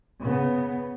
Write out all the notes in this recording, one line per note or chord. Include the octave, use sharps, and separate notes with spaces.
C#3 B3